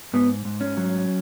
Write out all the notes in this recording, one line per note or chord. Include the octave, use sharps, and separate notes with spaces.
G#2 B3
G#2
C#4
F#3